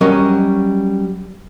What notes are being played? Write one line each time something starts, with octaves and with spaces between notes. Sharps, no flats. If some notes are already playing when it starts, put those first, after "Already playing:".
F#3 G3 C#4 A#4 D#5